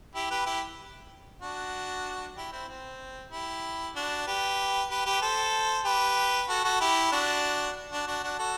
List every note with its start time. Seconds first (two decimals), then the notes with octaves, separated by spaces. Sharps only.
0.15 E4 G4
0.31 G4 B4
0.46 E4 G4
1.42 D4 F#4
2.37 E4 G4
2.52 C4 E4
2.69 C4
3.31 E4 G4
3.95 D4 F#4
4.26 G4 B4
4.90 G4 B4
5.06 G4 B4
5.21 A4 C5
5.85 G4 B4
6.49 F#4 A4
6.64 F#4 A4
6.81 E4 G4
7.12 D4 F#4
7.91 D4 F#4
8.07 D4 F#4
8.24 D4 F#4
8.39 F#4 A4